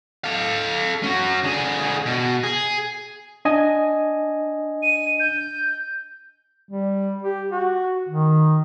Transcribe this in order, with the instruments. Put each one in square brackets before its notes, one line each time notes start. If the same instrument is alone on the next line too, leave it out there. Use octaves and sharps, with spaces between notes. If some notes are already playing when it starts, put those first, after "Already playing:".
[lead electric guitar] A4 F5
C#4 F#4
D3 G#4
B2
G#4
[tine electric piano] D4 D#5 G#5
[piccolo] D#7
G6
[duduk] G3
G4
F#4
D#3